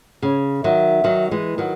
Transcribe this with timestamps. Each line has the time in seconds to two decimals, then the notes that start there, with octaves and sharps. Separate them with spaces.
0.22 C#3 C#5
0.64 D#3 F#3 E5
1.04 D#3 F#3
1.31 E3 G#3
1.58 D#3 F#3